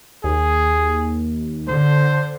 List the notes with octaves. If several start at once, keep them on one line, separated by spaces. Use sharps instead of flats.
D#2 G#4
D3 C5